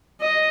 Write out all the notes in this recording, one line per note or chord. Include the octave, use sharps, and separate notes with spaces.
D#5